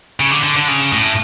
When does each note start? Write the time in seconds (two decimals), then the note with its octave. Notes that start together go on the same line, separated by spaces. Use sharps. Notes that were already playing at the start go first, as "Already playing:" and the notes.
0.20 C#3
0.31 D3
0.44 D3
0.56 D3
0.68 C#3
0.93 A2